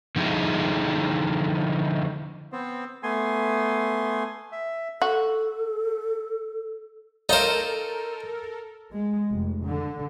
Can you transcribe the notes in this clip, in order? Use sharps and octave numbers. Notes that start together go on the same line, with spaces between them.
D3 F3 D#4 E4 G#4
B3 C4 C5
A3 B3 G#5 C6
E5
F#4 A4
D#4 A4 A#4 C5 C#5 F5 A#5
G#3
F1
D3